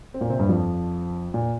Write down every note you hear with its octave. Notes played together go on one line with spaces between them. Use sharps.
C4
A#2 A#3
C3 C4
G2 G3
F2 F3
A#2